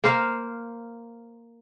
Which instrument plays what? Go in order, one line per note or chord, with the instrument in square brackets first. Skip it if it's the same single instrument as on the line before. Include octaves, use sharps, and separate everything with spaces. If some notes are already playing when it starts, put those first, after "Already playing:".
[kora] A#3 A#4 C5 F5